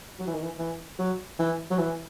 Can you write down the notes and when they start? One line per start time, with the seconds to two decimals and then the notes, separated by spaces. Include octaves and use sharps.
0.19 F#3
0.27 E3
0.34 D#3
0.43 E3
0.59 E3
0.99 F#3
1.39 E3
1.71 F#3
1.79 E3